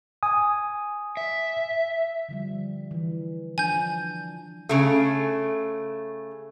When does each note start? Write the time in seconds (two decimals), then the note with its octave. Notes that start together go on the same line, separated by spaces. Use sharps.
0.23 G#5 D#6
1.17 E5
2.29 D3 F3 G3
2.91 E3
3.58 F3 D4 G#5 G6
4.69 C#3 A3